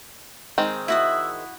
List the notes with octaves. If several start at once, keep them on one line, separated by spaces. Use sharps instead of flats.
D#3 G#3 C4
E4 F#4 E5 D#6